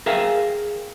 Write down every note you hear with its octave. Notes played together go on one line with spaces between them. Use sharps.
G#4 A#4 E5 F5 G5 G#5